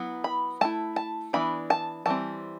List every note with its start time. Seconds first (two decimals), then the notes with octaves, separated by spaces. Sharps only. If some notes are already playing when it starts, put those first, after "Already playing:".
Already playing: F#3 B3 E4
0.24 B5
0.61 A3 E4 A5
0.96 A5
1.33 E3 B3 D4 B5
1.70 A5
2.06 E3 G3 C4 A5